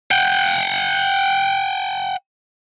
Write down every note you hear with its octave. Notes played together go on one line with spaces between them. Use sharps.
F#5 G5